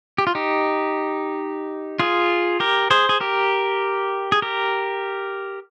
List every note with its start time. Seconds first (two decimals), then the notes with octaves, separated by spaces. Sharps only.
0.18 G4
0.27 F4
0.35 D#4 G4
1.99 F4 G#4
2.60 G4 A#4
2.91 G#4 C5
3.09 G#4
3.20 G4 A#4
4.32 G#4
4.42 G4 A#4